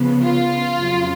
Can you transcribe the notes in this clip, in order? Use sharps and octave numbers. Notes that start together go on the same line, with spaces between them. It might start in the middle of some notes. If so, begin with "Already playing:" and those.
Already playing: C#3 F3 B3
F4
F2 C#3 F#3